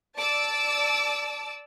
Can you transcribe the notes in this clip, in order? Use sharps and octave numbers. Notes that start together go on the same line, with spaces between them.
D5 A5 D6 E6